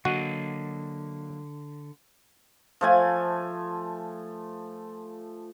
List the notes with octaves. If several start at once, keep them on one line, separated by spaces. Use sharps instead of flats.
D3 F#3 A#3 F#4 D#5
F3 A3 G#5